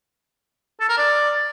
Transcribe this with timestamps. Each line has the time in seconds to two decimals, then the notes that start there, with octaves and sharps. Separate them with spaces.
0.80 A4
0.89 A#4
0.97 D5